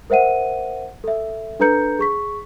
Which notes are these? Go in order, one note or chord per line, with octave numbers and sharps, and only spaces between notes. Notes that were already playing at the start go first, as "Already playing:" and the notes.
A#4 C5 E5 F#5 D#7
A4 E5
D4 A4 B4 A#5 G6 C#7
G#4 C#6 B6